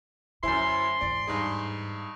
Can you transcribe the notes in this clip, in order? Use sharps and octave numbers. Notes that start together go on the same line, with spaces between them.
F#2 D3 E4 C5 G#5 C6 G6
E2 G#2 D5
G2 D#4 G#4